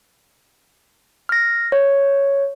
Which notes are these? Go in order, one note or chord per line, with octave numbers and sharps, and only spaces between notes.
F6 A#6
C#5